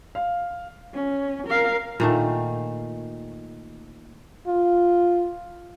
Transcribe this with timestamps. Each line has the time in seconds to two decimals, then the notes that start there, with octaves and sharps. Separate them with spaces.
0.15 F5
0.94 C#4
1.47 A#4 F5
2.00 A#2 D#3 A3
4.47 F4